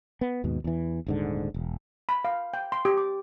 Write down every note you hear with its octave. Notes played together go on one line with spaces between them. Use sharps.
B3
D#2 G#2 B2
E2 E3
D#1 G#2 D3
E1
B5
F5
G5
C6
G4
D6